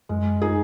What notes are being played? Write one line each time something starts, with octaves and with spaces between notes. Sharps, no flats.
F#2 G#3
D#4 G#4